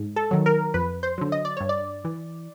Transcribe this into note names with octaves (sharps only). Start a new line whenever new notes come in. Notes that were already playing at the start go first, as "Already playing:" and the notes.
Already playing: G#2
A4
D#3 F#3
A#4
F2 B4
C5
D3 F#3
D#5
D5
G2 C#5
D5
E3